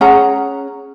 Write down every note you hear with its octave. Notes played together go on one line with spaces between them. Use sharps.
C#4 G#4 F#5 A#5